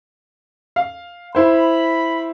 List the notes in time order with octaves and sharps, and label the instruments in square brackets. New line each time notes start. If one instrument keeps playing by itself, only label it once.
[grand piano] F5
[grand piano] E4 C5 [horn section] B5